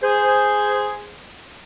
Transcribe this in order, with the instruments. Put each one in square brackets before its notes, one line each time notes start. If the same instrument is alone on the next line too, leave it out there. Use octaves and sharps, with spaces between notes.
[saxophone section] G#4 C5